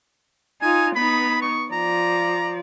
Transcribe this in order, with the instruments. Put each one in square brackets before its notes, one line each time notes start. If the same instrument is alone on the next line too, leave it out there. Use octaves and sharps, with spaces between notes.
[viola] D#4 F4 [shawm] G#5
[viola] B3 D#4 [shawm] B5
[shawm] C#6
[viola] F3 D5 [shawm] A#5